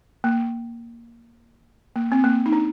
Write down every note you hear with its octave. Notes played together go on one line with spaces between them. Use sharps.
A#3
A#3
C4
A#3
D#4
D4